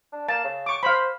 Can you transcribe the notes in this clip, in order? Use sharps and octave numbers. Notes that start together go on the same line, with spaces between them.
D4
A#3 A5
C#3
C#6 D6
C5 F5 B5